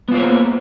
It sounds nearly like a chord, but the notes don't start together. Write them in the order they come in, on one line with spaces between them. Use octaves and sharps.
B3 F4 C5 C#5 A#3